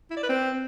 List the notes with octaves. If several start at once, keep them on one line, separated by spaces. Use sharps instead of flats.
E4
D5
B4
C4